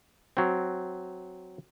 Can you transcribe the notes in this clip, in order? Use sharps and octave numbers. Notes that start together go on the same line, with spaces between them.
F#3 C4